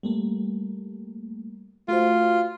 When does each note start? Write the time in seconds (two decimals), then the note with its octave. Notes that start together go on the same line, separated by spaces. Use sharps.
0.03 G3 A3 A#3
1.88 A3 F4 F#4 C5